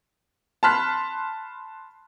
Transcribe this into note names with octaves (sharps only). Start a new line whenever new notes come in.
A5 B5 C6 F6 F#6 B6